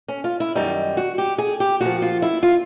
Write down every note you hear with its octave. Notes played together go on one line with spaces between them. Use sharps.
C#4
F4
E4
F#2 D#3 G3 D#4
F#4
G4
G#4
G4
A#2 F3 F#4
F4
E4
F4